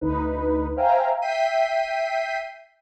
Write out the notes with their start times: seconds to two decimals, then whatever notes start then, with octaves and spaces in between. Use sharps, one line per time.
0.01 D2 D#4 B4
0.76 C5 E5 F5 G5 G#5 A#5
1.22 E5 G5 G6 B6 C7 D#7